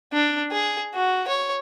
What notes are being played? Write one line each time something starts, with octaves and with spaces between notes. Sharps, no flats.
D4
G#4
F#4
C#5